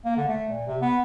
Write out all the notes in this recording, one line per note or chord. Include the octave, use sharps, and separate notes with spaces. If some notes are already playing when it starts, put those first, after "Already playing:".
A#3
D3
A3
A#2
C3
B3